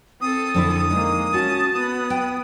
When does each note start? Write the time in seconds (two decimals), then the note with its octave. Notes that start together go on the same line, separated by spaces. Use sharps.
0.21 C4 A4 D#6
0.54 F2 D3 E4
0.91 G#3 A#3 D#4
1.34 C#4 F#4 A5
1.75 B3 D#6
2.10 G5